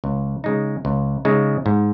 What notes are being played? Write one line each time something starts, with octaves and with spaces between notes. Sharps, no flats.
C#2
C#3 G#3 D#4
C#2
C#3 G#3 D#4
G#2